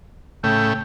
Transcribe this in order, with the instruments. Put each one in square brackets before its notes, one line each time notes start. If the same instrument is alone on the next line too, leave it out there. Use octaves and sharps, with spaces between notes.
[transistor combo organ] A2 C#3 A3 [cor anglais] G5